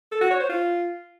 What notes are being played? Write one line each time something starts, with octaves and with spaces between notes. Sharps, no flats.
A4
F#4
C#5
C5
F4